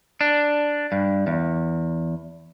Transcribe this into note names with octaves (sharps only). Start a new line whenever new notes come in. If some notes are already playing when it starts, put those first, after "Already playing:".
D4
G2
E2